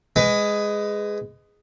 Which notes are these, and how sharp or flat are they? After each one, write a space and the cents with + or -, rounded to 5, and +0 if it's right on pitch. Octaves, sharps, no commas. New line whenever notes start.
G#3 +0 B4 +25